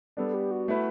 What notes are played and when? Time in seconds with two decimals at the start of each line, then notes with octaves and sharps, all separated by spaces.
0.17 G3 B3 D4 A4
0.34 G4
0.51 F#4
0.68 A3 E4 B4